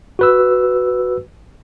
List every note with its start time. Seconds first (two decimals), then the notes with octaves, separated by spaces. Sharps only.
0.19 F#4 B4 E6